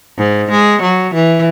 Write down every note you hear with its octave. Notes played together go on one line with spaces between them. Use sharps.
G#2
G#3
F#3
E3